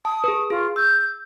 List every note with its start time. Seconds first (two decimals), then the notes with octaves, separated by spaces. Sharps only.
0.05 A5 D#6
0.24 G#4 B4
0.50 F4 G#4
0.76 E6 G6